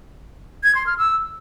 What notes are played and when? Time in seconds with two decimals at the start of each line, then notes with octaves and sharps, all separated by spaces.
0.64 G#6
0.75 C6
0.87 F6
0.98 E6